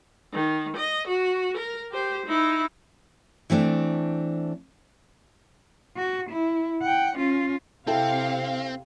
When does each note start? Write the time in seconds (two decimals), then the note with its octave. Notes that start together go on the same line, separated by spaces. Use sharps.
0.33 D#3
0.77 D#5
1.07 F#4
1.57 A#4
1.91 G4 C5
2.26 D#4 E4
3.50 E3 A3 C4 D4
5.97 F#4
6.30 E4
6.82 F#5 G5
7.17 C#4 F4
7.87 C3 C4 E4 A4 F5 G5